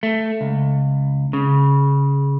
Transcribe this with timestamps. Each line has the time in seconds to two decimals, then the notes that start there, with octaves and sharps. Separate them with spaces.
0.03 A3
0.41 C#2
1.33 C#3